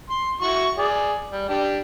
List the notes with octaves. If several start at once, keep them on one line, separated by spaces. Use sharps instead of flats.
C6
E4 F#4 C#6
G#4 D5
G3
D4 G4